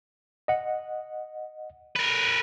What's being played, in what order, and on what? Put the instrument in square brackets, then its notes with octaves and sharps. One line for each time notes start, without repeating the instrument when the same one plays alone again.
[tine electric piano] D#5 F#5
[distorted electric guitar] A#4 B4